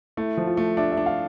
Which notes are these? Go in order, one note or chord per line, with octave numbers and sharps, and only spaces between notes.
A3 E4
F3
F4
A3
D4 E5
E5
D4
F5